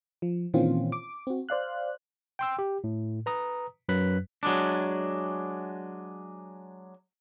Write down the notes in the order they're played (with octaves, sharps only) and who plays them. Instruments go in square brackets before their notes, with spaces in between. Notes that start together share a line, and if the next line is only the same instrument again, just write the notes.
[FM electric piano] F3
A#2 D#3 E3 C4 C#4 F4
D6
C4 F#4
C5 D5 F5 F#6
[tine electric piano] G5 C6 E6
G4
A2
B4 A#5 D#6
F#2 F#3 B4 F#6 B6
[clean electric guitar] F#3 G#3 D4